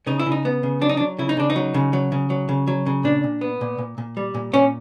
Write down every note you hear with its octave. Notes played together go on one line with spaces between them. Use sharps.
C#3 D#4
E4
C#3
D#4
B3
C#3
F#3 D4
D#4
D4
F#3
C#3 E4
D#4
C#3 D4
D#4
F#3
C#3
F#3
C#3
F#3
C#3
F#3
C#3
A#2 D4
A#2
B3
A#2
A#2
A#2
G3
A#2
A#2 C#4